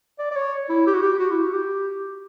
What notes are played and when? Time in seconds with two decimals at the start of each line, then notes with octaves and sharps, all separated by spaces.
0.19 D5
0.31 D5
0.36 C#5
0.69 E4
0.87 G4
0.94 F#4
1.02 G4
1.19 F#4
1.31 E4
1.41 F#4
1.53 G4